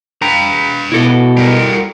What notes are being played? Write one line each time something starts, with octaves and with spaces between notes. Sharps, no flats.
B4 G5 A#5
B2 E4 F#4 A4
G3 A#4